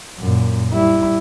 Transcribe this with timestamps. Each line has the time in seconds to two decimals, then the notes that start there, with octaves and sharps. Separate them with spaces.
0.19 F#2 A#2
0.72 G3 E4